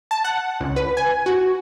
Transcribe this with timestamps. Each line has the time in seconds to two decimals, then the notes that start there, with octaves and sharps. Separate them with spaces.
0.11 A5
0.24 F#5
0.60 C#2
0.76 B4
0.97 G#5
1.26 F#4